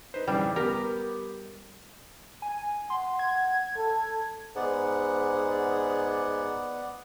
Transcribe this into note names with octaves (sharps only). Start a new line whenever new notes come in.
D#4 B4 C5
F2 C#3 E3 G3
B3 G4 A#4
G#5
F#5 C6
G#6
A4
G#2 B3 D5 F#5